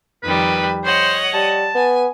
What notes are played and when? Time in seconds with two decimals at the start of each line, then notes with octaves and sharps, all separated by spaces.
0.23 F2 D#3 G3 B4
0.85 C5 C#5 D#5 F#5
1.34 G3 A5
1.75 B3 G#5